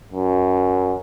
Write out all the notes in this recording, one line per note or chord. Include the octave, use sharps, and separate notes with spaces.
F#2